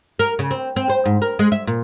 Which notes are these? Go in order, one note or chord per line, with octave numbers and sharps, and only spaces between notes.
A#4
C#3
C4
C4
C5
G#2
A#4
G#3
E5
A#2